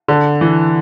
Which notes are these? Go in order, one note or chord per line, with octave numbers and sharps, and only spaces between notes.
D3
E3